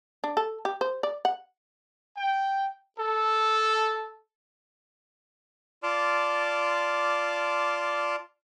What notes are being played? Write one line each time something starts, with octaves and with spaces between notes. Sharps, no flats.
D4
A4
G4
C5
D5
F#5
G5
A4
F4 D5 A5 C6 D6 F6